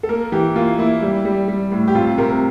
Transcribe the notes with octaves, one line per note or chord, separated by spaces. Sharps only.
A4
A#3 A#4
E3 G4
A#3 F4
A#3 E4
G3
G3
G3
A2
G4
C3 F4
C3 A#4